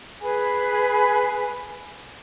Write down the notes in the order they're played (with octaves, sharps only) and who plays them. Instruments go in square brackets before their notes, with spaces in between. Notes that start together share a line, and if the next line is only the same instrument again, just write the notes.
[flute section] G#4 B4 G#5 B5